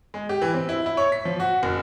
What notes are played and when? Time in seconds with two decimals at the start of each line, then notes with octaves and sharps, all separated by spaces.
0.14 G#3
0.29 G4
0.42 E3
0.54 C4
0.69 E4
0.86 E4
0.97 C#5
1.12 B6
1.25 F3
1.40 F#4
1.63 F#1